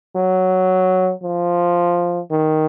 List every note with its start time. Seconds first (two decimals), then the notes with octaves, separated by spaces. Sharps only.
0.16 F#3
1.23 F3
2.31 D#3